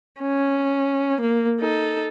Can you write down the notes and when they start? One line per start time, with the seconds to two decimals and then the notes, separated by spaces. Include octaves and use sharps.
0.20 C#4
1.20 A#3
1.60 D#4 A4